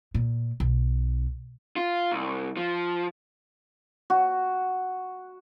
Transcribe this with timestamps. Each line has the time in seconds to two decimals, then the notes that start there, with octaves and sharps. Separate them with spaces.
0.14 A#2
0.60 B1
1.76 F4
2.12 C2
2.57 F3
4.10 F#4